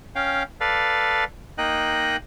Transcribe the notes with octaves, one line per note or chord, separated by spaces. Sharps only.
C#4 F5 G5
A4 B4 D5 F5
A#3 D#4 D#5 G5 F#6